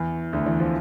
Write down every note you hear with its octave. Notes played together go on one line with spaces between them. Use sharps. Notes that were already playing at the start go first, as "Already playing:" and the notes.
Already playing: E2 E3
D2 D3
E2 E3
F3